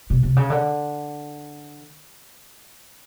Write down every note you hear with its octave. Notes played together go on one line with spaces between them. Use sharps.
B2
C3
C#3
D3